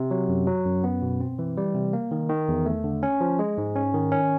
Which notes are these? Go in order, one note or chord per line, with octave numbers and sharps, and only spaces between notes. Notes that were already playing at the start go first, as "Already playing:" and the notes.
Already playing: C3
F#3
F#2
F#3
F#2
B3
B2
C4
E3
G3
C3
A#3
D#3
D#3
E2
A3
D3
C#4
F3
G#3
G#2
C#4
D#3
C#4